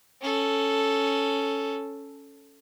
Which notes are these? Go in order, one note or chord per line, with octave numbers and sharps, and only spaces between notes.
C#4 A4